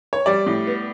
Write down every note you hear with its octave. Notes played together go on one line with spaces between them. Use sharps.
C#5
G3 D5
A2
B3